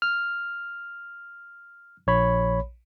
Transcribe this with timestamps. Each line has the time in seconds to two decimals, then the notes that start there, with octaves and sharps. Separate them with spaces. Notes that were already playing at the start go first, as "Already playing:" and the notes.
0.02 F6
2.07 A#1 C#5 B5